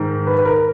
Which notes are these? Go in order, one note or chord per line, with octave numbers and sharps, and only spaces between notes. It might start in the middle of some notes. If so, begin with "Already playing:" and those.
Already playing: G#2 D#3
B4
B4
A#4